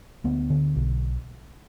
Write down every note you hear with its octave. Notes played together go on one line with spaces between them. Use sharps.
D2 B3
D3
B1